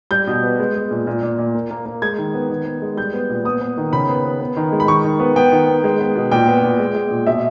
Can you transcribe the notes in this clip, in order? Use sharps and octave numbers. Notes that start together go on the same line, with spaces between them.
G3 G6
B2
B3
G#3
G#3
A#2
A#2
A#2
A#2
A#3
A#3
A#3
G#3 G#6
D#3
B3
D#3
B3
G#3
G3 G6
B3
A#2
B3 D#6
B3
D#3
C#3 B5
B3
B3
B3
D#3
G#3
B5
D#3 C#6
D#3
B3
B3 G5
D#3
B3
G#3
B3
B2
A#2 G5
B3
A#2
G#3
G#3
A#2
B2 E5